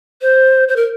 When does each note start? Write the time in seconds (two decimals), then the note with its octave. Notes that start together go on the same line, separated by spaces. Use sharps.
0.22 C5
0.68 C5
0.76 A#4